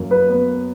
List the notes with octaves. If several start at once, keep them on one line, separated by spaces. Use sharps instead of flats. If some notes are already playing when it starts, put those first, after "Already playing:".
Already playing: F#2 A#3
B4
B3